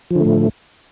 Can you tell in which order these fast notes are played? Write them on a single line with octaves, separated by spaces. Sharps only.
F3 D3 A3 A2